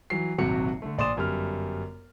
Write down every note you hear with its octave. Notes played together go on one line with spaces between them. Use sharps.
E3 F#3 C7
D#1 G#1 C3 F#3 F#4 C#7
D3 A3
A#1 D5 C6 D#6 E7
G1 F#2 G3 F6